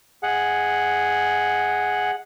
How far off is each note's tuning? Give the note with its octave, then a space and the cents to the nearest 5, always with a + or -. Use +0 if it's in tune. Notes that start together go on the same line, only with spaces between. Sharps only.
G#4 +0 D#5 +30 F#5 +0